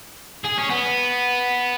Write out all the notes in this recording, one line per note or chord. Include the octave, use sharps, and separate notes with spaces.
G#4
C#4
B3